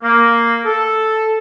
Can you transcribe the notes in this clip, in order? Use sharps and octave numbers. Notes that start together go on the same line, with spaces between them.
A#3
A4